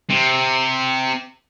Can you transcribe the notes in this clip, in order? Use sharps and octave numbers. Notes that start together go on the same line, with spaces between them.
C3